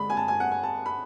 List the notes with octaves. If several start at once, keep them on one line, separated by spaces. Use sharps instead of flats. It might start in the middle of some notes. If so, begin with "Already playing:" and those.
Already playing: D3 G#3 D4 B5
G#5
A5
G#5
F#5
G#5
A5
B5